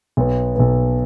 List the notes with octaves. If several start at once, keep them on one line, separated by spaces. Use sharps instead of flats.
B1 B2 B3
B1 B2 B3